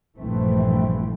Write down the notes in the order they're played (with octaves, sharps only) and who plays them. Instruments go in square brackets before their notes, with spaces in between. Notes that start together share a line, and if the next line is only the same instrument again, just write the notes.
[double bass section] A#1 G2 E3 A3 C4